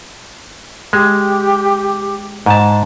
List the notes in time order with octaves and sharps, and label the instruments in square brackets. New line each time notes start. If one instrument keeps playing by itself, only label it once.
[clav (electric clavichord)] G#3 [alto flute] G4
[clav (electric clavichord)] G#2 A5